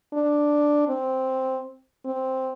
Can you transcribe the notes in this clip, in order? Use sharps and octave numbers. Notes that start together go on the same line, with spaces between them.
D4
C4
C4